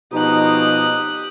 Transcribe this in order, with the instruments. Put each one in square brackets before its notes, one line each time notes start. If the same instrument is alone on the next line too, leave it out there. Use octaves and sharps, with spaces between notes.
[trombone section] B2 F3 D#4 [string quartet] G4 D#6 F#6